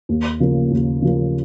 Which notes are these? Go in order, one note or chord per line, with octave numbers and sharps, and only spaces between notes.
D#2
C#3 F3 A#3
D#2
C#3 F3 A#3